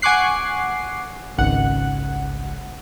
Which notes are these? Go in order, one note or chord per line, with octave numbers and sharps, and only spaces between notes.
F#5 G#5 C#6 D6 F#6 C7
G#1 C#2 F#5